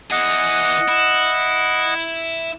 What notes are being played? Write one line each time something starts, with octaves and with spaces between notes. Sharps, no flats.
E3 G#4 D#5 F#5
E4